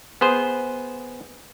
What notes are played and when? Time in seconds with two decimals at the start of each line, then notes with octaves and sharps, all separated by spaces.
0.21 B3 G#4 C5